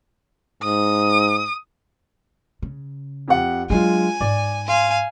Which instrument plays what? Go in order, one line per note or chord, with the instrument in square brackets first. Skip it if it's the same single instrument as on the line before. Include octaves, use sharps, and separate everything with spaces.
[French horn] G#2 [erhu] D#6
[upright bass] C#3
[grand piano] F2 G4 F#5
[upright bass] F#3 D4 [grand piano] G#3 F4 [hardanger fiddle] G#5
[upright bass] G#2 [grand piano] D5
[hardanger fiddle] F5 G#5 [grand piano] C6